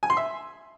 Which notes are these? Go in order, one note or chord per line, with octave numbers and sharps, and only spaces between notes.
G#5
C6
E5